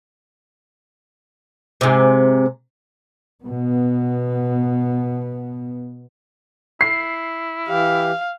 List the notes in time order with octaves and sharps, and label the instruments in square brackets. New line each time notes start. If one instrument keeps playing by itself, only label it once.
[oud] G#2 C3
[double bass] B2 B3
[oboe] E4 [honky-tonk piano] C7
[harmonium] E3 G4 [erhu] F5